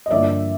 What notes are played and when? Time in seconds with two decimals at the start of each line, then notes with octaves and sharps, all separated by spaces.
0.06 D#5
0.10 G2 D3 F3 A#3 D5 E5